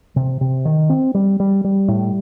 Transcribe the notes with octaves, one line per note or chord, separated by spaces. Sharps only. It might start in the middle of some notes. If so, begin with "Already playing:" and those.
C3
C3
D#3
C4
G3
G3
G3
A2